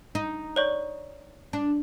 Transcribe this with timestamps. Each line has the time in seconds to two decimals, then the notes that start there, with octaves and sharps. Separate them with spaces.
0.15 D#4
0.56 C#5 D5 C#6
1.53 D4